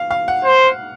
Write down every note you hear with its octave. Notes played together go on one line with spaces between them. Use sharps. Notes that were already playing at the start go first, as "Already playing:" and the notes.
Already playing: F5
F5
F#5
C5